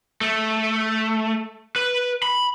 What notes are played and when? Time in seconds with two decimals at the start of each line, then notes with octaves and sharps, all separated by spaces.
0.21 A3
1.76 B4
2.23 B5